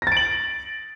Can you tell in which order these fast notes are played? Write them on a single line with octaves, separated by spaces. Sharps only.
A#6 A6 D7 F#7